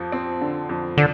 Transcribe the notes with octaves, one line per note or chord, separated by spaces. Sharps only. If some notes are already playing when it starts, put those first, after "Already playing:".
Already playing: F2 F3
C4
D3
F2
D3 D4